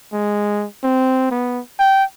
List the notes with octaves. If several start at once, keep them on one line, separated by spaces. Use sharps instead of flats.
G#3
C4
B3
G5